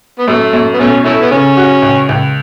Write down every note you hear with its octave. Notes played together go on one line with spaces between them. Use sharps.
B3
F#2 A3
F#2
B3
B2 A3 C#4
A3 C#4 E4 A4
B3
C#3 C#4
F#4
C#2
C#2